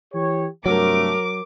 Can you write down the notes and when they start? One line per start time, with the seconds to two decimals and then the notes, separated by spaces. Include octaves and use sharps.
0.14 E3 G4 C#5
0.66 G2 C3 F#3 A3 A#4 D6